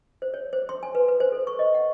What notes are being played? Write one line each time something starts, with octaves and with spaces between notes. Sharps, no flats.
C5
C#5
C5
C6
G#5
B4
B4
C5
A4
C#6
D#5
F#5